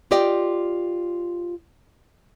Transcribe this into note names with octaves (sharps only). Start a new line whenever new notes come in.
F4 G4 D5 D#5 G5